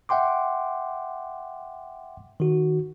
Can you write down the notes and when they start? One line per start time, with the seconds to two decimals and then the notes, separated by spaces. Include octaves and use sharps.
0.09 E5 F#5 G5 C6 D6
2.40 D#3 F#4